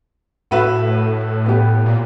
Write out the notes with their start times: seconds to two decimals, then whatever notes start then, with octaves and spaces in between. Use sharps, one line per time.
0.51 A2 F#4 B4 E5
1.46 B3 G4
1.86 A#2